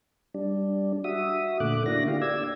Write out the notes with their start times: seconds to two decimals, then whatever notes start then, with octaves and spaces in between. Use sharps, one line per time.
0.34 G3 D4
1.04 F#4 E5 D#6
1.60 A#2 D3 A3 D6 F#6
1.86 D3 A#3 D4 E4 F#4 A#6
2.08 G4 F5
2.22 D5 E6 G#6